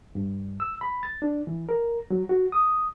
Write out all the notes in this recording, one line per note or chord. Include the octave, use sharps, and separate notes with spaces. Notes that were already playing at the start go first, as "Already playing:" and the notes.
G2
E6
B5
A6
D4
E3
A#4
F#3
F#4
D#6